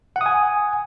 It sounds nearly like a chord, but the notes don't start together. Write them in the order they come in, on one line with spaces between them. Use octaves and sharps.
F#5 D#6 G#5